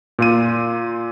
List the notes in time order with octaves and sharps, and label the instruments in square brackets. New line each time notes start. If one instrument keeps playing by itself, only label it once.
[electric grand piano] A#2 F4 D#7